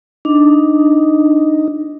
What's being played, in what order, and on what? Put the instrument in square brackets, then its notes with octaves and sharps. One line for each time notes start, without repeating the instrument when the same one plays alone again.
[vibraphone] D4 [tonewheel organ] D#4